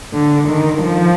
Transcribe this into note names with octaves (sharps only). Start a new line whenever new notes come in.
D3
D#3
F3